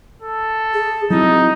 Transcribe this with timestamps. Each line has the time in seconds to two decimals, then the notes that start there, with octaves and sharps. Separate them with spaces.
0.22 A4
0.74 G#4
1.10 F#3 C4 D#4 E4